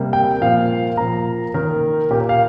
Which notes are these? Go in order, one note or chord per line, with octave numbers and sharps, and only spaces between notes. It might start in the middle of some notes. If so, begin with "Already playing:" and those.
Already playing: C3 G3 A#3
G5
A#2 F3 A#3 F5
A#2 F3 A#3 A#5
D#3 A#3 A#4
A#2 A#3 G4
A#4
F5